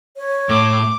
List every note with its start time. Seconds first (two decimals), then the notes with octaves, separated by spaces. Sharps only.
0.17 C#5
0.49 A2 D6